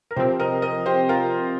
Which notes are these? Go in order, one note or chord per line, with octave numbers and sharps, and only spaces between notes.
A#4
C3 F3 C4 G4 C5
A#4 D#5
A#4 D#5
G4 C5
F4 A#4